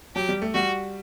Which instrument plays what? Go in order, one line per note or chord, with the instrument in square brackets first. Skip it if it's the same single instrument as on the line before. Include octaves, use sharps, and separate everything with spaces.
[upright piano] F#3 [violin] G4
[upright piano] G3
A3
[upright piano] G3 [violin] F#4